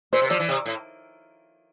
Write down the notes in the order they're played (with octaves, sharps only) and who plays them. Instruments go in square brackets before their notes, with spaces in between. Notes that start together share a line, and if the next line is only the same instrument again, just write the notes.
[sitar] A#2 [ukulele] C5
[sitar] C3
[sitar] F3 [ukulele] D5
[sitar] E3
C3
A2